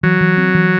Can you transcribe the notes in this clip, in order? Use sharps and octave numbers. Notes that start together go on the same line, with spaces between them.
E3 F#3
E3
C4
E3